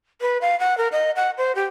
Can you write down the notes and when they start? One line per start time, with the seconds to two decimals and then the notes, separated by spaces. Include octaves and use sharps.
0.21 B4
0.41 F5
0.60 F#5
0.78 A#4
0.92 D#5
1.16 F#5
1.38 C5
1.55 G4